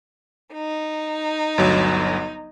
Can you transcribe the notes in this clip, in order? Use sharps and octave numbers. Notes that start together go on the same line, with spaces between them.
D#4
G1 D2 F#3